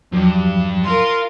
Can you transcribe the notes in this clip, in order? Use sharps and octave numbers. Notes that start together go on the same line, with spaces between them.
E2 G2 F3 F#3 G4
F4 A#4 C6